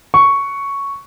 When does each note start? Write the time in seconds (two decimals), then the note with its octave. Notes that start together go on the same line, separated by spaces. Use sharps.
0.14 C#6